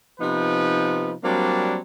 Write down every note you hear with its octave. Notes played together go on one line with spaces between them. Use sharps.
C3 F3 B3 D#4 B4
F#3 G3 A#3 C4 D4